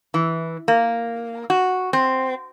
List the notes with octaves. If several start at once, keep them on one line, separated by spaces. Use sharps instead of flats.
E3
A#3
F#4
C4